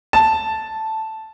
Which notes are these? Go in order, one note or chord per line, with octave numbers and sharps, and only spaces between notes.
A5